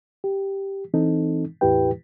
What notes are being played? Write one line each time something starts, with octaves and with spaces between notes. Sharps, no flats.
G4
E3 C4 D#4 A4
E2 A2 E4 G4 B4 G5